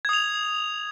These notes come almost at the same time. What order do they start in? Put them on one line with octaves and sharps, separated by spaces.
G#6 D#6 F7